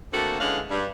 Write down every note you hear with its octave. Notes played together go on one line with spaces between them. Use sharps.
D3 A3 A#3 C4 F#4 A4
D3 E3 G#3 C#4 F5 F#5
G2